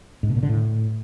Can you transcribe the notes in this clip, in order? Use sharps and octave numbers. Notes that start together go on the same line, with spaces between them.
G#2
B2
A#2
D3
A2